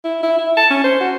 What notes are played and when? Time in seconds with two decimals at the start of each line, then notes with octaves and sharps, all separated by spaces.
0.05 E4
0.23 E4
0.38 E4
0.57 A5
0.71 C#4
0.84 C5
1.00 F#4